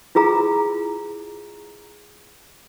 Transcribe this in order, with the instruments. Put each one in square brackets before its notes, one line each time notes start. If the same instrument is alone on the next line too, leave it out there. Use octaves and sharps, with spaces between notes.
[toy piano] E4 F4 G#4 A#5